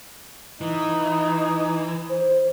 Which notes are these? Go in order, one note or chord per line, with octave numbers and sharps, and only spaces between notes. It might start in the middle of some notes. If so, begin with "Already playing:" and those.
E3 D#4
C5